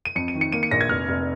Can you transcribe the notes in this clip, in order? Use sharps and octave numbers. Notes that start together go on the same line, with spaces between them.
D#7
F2 C#7
D#7
D#3
C#7
A#3 D#7
C#7
A#1 A#6
G#6
F1 F6
F1